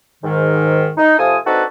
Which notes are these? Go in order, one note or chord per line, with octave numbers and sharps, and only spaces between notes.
G#2 D#3
D#4
C3 F3 F4 A4 G#5 D#6
C4 D4 D#4 F#4 A4 B4